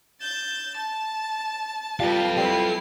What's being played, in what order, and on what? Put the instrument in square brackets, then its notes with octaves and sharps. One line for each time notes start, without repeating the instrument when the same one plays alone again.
[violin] G6 A6 [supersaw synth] E7
[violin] A5
[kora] G3 [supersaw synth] F4 B4 [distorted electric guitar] A4 F5
[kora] G3 C4 [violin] E4 C7